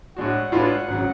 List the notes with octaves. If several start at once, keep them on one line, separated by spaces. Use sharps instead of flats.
A2 G#3 D4 F#4 F#5
A2 G#3 D4 F4 B4
G#1 C#3 F#3